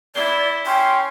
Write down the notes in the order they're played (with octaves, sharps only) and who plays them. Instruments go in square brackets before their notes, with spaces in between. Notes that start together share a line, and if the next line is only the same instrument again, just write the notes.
[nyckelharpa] E4 [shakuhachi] D5 [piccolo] G7
[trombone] C#4 [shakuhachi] G5 [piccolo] C6